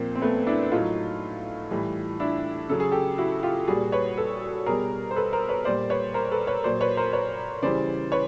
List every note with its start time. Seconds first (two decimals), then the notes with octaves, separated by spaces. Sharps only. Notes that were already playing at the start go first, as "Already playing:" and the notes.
Already playing: A#2 F3 A#3 C4
0.15 C4
0.22 A3 B3
0.47 D4 E4
0.72 A2 F#3 D#4 F4
1.71 A2 E3 G3
2.20 D4 E4
2.69 C#3 F#3 A4
2.80 G#4
2.92 G4 A4
3.18 E4 F#4
3.43 F4 G4
3.68 A#2 G3 F#4 G#4
3.92 B4 C#5
4.17 A4 B4
4.66 B2 G3 G#4 A#4
5.11 C5
5.16 A4 B4
5.32 A#4 C5
5.49 B4 C#5
5.65 A#2 G3 C5 D5
5.90 B4 C#5
6.14 A#4 C5
6.31 A4 B4
6.47 B4 C#5
6.64 A#2 F#3 C5 D5
6.81 B4 C#5
6.97 A#4 C5
7.13 B4 C#5
7.62 C#3 E3 G3 C5 D5
8.12 B4 C#5